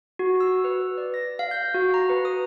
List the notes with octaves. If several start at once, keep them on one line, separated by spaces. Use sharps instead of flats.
F#4
E6
B4
D5
A#6
F5
G6
F#4
A#5
B4
D#6